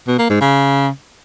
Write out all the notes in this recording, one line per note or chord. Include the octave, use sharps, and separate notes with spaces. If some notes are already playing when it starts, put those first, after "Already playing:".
B2
A#3
G#2
C#3